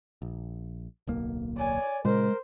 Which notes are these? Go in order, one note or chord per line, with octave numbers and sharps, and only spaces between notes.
A#1
D1 B1 A#3
C#5 D5 G#5
A#2 C#3 G#3 A#4 C5